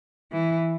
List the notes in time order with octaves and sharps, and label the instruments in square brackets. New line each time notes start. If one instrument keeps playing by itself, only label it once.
[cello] E3